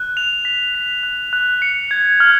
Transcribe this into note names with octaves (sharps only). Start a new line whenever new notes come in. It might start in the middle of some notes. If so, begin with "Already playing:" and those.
Already playing: F#6
F7
B6
B6
F#6
F#6
C#7
G#6
F6